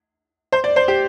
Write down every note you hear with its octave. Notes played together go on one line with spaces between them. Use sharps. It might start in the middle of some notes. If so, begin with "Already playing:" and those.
C5
D5
C5
G4